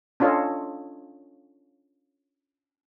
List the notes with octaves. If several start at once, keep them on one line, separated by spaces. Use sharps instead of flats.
C#4 D4 F4 A4 C#5 D#5